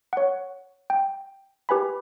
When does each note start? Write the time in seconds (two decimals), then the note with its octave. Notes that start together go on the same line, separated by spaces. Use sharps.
0.13 C#5 F#5
0.90 G5
1.69 G4 B4 G#5 B5